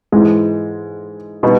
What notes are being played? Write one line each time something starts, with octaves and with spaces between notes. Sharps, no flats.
G#2 E3 G#3
B2 G3 B3 D#4